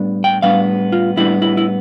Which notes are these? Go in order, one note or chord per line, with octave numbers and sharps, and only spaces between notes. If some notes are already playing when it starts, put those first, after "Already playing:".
Already playing: A2 G3 B3 D4
G5
A2 G3 B3 D4 F5
F4
A2 G3 B3 D4 E4
E4
E4